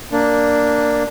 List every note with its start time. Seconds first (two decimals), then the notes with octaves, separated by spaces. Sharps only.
0.12 A#3 D4